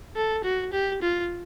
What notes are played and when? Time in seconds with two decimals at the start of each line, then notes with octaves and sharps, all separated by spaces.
0.16 A4
0.44 F#4
0.73 G4
1.02 F4